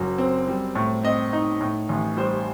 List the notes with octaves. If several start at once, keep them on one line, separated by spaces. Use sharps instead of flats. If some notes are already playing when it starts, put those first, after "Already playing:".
Already playing: F#1 F#3
C4
G3
A2
C4 D#5
D#4
A2
A1
G3 C5